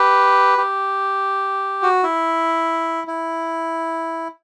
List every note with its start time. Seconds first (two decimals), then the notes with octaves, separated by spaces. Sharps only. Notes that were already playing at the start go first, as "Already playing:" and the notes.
Already playing: G4 B4
0.58 G4
1.83 F#4
2.03 E4
3.07 E4